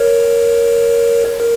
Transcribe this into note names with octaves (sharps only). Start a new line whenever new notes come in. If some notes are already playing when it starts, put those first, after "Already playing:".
Already playing: A#4 C#5
A#4